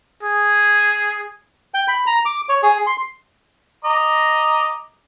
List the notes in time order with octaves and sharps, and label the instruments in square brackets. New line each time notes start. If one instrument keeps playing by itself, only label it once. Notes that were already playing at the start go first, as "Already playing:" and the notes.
[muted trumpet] G#4
[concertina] G5
B5
A#5
D6
C#5
G#4
C6
[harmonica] D#5 A#5 D6